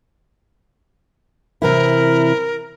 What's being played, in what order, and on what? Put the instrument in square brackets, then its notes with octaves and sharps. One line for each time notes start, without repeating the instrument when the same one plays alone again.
[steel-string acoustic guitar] C3 E3 E4 [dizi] A#4